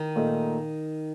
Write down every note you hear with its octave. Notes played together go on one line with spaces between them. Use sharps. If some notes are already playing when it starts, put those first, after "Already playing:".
Already playing: D#3
A#2 A3 D#4